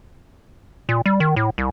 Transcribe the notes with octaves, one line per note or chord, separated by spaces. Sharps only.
A#2
G3
D#3
A2
C2